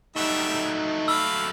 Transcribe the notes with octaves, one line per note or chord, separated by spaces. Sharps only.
F#3 G3 A3 D#4 E5
F5 B5 E6